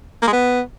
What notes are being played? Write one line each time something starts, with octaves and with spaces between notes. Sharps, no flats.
A#3
G#3
B3